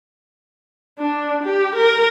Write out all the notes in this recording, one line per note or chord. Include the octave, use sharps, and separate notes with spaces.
D4
G4
A#4